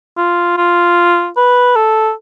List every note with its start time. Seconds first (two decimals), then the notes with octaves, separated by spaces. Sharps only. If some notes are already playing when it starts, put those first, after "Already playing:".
0.17 F4
0.57 F4
1.37 B4
1.75 A4